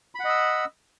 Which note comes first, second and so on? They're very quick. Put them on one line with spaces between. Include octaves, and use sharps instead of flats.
B5 F#5 D#5 E6